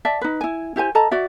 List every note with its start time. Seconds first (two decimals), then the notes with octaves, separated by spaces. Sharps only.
0.05 D5 E5 A5
0.21 D#4 B4
0.41 E4 G#5
0.76 E4 G4 C5 G#5
0.95 A4 D#5 A5 A#5
1.11 F#4 D5 E5